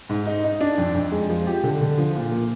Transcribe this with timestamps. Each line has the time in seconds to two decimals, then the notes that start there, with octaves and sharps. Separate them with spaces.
0.09 G#2
0.26 D#4
0.44 D#4
0.61 D4
0.78 F2
0.95 F2
1.11 G#3
1.30 F3
1.47 G4
1.63 D3
1.81 D3
1.98 F3
2.15 A#2
2.31 A#3